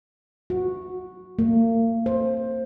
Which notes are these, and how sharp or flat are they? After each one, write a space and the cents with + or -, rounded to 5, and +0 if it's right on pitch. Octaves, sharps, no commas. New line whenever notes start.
F#4 -10
A#3 -35
C5 +15